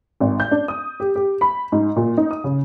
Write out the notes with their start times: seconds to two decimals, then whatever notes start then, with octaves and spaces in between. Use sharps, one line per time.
0.20 G#1
0.40 G6
0.51 D4
0.68 D#6
1.00 G4
1.16 G4
1.41 B5
1.72 G#2
1.96 A#2
2.17 D#4
2.31 D#6
2.44 C#3